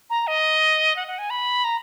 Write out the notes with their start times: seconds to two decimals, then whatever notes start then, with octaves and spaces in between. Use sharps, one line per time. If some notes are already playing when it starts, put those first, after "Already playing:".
0.10 A#5
0.27 D#5
0.96 F#5
1.07 F#5
1.18 G#5
1.30 B5
1.64 A#5